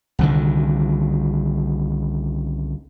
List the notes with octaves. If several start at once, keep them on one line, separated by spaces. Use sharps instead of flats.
C2 D3 D#3